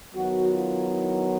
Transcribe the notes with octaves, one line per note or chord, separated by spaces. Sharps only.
D#3 F#3 B3 F#4
F4
E4